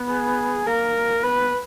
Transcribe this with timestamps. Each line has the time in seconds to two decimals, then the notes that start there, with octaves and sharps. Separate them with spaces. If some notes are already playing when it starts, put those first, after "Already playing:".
Already playing: B3
0.10 G#4
0.66 A#3 A#4
1.22 B3 B4